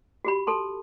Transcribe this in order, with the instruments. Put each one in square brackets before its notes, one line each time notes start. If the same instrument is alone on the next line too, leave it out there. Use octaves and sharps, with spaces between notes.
[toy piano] F#4 G4 B5
A4 A5 C6